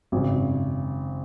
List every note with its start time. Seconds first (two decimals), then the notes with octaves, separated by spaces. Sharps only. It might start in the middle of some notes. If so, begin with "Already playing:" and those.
0.12 G#1 F#2 C#3